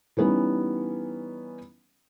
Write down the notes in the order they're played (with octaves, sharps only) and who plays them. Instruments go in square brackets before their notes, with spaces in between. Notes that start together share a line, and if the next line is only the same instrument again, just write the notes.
[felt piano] E3 G3 B3 C#4 D#4